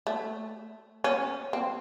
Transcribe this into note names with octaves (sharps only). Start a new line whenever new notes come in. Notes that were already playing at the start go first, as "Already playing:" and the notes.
A3
C#4
C4